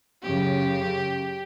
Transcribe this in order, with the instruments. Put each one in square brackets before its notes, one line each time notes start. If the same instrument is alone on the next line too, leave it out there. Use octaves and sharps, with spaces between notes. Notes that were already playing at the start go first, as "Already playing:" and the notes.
[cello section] F#2 C#3 [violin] G4